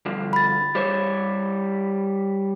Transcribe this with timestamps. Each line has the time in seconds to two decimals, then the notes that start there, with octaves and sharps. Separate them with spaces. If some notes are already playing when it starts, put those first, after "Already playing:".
0.06 G2 D3 F3
0.33 B5 A6
0.75 G3 C5 C#5